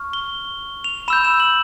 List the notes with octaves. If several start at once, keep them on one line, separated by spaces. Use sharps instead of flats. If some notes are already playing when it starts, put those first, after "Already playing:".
Already playing: C#6 F6
G7
F7
B5 E6 G6 E7
E7
F#7